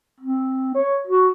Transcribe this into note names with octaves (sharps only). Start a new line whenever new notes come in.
C4
C#5
F#4